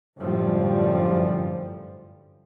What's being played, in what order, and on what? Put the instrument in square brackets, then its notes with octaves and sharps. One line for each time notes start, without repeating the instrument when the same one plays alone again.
[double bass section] G1 F#2 A2 F3 G3